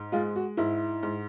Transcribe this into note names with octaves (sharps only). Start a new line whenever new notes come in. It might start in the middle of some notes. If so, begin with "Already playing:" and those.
Already playing: G#2
G#3 F4
F#4
G#2 E4
G#2